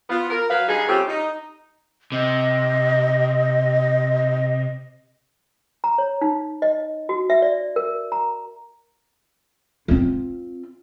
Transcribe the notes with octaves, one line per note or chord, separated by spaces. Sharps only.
B3 F4
A#4
F#3 B4 F5
D3 G3 D#4 G#4
G3 A3 C4 C#4 F4 G4
D#4
C3 D#5
A#5
C#5
D#4
D#5
F#4
E5
D5
A#4
A#5
C4 F4